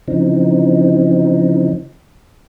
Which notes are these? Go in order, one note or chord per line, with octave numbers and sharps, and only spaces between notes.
C#3 E3 F3 C4 D#4